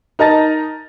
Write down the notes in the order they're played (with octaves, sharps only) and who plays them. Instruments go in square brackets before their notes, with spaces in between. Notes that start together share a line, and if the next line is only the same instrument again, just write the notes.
[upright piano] D#4 A#4 D#5 A5 A6